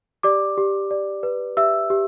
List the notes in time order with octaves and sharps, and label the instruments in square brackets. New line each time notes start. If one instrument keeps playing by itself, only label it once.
[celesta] G4 D5 D6
G4
D5
B4
G4 E5 E6
G4